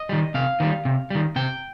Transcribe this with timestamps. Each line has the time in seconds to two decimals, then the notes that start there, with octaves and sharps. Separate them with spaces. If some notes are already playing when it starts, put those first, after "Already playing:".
Already playing: D#5
0.09 D#3 G3
0.34 C3 F5
0.60 D#3 G3
0.85 C3
1.10 D#3 G3
1.36 C3 G5